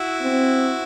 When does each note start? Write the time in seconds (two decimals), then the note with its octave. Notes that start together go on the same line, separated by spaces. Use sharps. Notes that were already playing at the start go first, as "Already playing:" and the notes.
Already playing: E4 F#4
0.22 C4